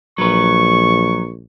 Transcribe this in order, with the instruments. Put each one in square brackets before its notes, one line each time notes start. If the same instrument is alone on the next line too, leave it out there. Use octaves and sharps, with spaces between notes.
[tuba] A#1 [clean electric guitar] F#3 B4 [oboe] C#6